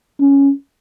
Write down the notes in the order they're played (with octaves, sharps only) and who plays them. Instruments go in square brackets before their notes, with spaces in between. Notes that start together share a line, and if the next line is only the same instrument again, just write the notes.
[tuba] C#4